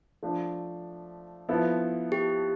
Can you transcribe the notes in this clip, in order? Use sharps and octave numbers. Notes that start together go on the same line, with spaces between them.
F3 A3 D4
F3 B3 E4 A4
G4